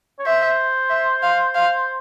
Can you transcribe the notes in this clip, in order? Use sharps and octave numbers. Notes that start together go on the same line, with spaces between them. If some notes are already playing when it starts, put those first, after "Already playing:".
C#5
C5 E5
E5
F5
F5